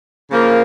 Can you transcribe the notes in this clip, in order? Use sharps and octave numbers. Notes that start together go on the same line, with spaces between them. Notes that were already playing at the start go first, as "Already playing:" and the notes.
C#3 F3 A#3